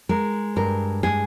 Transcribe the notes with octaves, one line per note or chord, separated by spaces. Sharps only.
G#3 A#4
G2 A#4
G#3 G#4